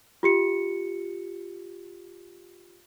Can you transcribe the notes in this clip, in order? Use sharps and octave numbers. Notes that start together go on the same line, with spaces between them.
F4 G4 C#7